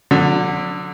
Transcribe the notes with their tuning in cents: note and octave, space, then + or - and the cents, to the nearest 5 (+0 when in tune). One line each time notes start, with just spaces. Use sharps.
D3 +0 F#3 -40